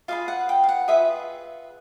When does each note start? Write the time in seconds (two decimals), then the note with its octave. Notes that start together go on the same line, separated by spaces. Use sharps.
0.08 F4 G#4 B4 F5
0.28 F#5
0.49 G5
0.64 F5
0.69 F#5
0.88 F4 G#4 B4 E5